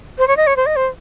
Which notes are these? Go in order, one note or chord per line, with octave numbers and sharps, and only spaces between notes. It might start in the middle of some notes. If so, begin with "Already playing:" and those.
C5
C#5
D#5
C#5
C5
D#5
C5